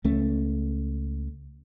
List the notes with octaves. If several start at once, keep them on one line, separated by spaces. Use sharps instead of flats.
C#2 A3 C#4